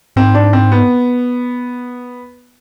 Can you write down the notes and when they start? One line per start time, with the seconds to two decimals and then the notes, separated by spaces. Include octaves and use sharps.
0.16 G#2 C4
0.34 D4
0.53 C4
0.72 B3